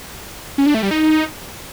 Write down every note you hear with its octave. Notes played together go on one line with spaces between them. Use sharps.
C#4
D4
A3
G3
D#4